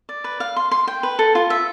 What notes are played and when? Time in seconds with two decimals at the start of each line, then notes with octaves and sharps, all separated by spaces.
0.09 D5
0.24 B4
0.40 F5
0.56 C6
0.71 C6
0.87 G5
1.03 B4
1.19 A4
1.35 F4
1.50 E5